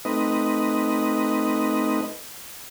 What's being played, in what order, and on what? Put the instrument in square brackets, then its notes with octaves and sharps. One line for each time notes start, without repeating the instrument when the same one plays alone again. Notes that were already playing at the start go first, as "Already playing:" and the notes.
[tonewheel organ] A3 C4 D#4 B4 D#5